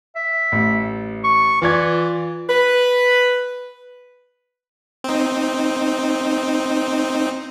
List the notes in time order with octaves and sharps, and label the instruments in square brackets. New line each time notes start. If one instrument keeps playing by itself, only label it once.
[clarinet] E5
[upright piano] A1
[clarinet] C#6
[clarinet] E3 [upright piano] F4 D5 G#6
[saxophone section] B4
[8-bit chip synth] C4 D#4